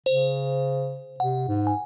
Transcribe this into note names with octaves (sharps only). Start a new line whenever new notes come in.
C#3 C5
C3 F#5
G#2
G#5